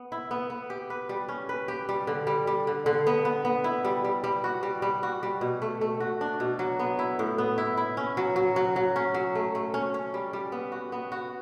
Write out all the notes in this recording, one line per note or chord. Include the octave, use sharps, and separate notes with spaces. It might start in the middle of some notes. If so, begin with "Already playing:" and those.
Already playing: B3
E4
B3
B3
G4
B4
G3
C#4
B4
G4
G3
D3
G3
G3
D3
D3
B3
B3
B3
E4
G3
G3
G3
F#4
G3
G3
F#4
G3
B2
A3
A3
F#4
D4
B2
F#3
B3
E4
A2
B3
E4
E4
C#4
F#3
F#3
F#3
F#3
C#4
F#3
A3
A3
C#4
C#4
G3
G3
B3
F#4
B3
F#4